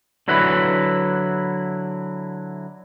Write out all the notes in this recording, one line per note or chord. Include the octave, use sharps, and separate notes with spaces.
D3 F#3 E4 B4